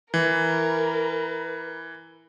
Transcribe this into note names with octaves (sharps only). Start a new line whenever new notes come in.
E3 A#4 B4